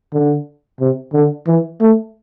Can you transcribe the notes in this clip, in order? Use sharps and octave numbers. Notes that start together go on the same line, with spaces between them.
D3
C3
D3
E3
A3